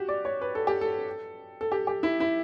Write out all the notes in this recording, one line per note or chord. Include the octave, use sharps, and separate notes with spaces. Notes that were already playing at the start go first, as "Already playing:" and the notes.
Already playing: F#4 G4
D5
C#5
B4
A4
G4
A4
A4
G4
G4
E4
E4